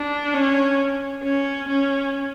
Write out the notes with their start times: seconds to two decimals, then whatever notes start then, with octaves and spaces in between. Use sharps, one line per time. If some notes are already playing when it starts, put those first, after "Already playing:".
Already playing: D4
0.34 C#4
1.23 C#4
1.69 C#4